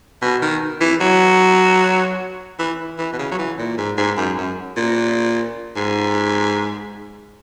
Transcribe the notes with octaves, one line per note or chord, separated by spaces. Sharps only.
B2
D#3
E3
F#3
E3
E3
B2
C#3
F#3
E3
A#2
G#2
G#2
F#2
F#2
A#2
G#2